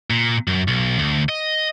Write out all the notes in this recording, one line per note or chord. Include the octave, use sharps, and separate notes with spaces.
A#2
F#2
B1
D2
D#5